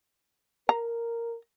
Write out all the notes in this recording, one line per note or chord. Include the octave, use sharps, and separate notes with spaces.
A#4 A#5